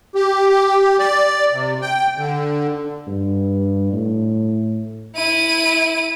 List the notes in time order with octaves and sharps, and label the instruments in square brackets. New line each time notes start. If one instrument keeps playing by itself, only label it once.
[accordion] G4
D5
C3
G5
D3
[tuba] G2
A2
[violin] E4 D#7